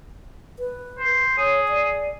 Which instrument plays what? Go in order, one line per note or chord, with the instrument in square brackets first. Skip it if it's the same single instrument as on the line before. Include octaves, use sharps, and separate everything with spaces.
[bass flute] B4
[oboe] C5
[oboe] G#4 [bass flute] C#5
[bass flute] D5